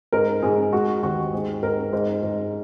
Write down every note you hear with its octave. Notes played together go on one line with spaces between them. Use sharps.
G#2 A#4
G#2 G#4
G#3 F#4
D#2 F#4
G#2 G#4
G#2 A#4
G#2
G#2